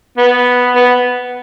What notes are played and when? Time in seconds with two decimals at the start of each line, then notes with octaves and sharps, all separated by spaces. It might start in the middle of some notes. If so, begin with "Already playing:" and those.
0.18 B3
0.75 B3